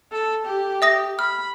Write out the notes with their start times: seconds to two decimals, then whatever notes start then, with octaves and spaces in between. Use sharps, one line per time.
0.12 A4
0.45 G4
0.82 E5 D#6 A#6
1.19 B5 F6